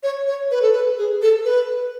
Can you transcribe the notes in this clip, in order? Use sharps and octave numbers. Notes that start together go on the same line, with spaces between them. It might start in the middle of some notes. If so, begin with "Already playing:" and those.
C#5
C#5
B4
A4
B4
G#4
A4
B4